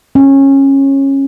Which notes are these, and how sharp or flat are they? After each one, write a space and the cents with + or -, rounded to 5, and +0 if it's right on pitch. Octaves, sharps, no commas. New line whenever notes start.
C#4 -20